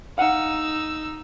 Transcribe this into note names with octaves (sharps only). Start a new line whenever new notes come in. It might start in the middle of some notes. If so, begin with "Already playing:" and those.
D#4 F5 F#5 E6